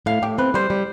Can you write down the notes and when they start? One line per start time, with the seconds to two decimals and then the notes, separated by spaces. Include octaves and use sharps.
0.06 A2 F5
0.22 A2 G4
0.38 C4 B4
0.54 G3 C5
0.70 G3